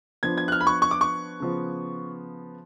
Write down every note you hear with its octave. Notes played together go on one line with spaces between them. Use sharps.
F3 B3 D4 G#6
G#6
F#6
F6
B5
C#6
C#6
D6
C#6
C#3 F3 B3